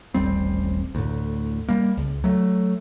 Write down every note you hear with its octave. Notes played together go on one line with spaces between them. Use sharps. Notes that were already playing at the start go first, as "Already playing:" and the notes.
D#1 A1 G3 C4
D2 A2
G3 A#3
C#2
F#3 A3